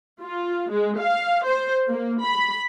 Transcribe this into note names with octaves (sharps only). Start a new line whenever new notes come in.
F4
G#3
F5
C5
A#3
B5